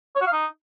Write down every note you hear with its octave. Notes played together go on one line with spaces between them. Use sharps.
C#5
F#4
F5
D#4